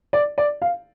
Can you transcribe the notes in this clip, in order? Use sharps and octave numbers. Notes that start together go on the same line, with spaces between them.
D5
D5
F5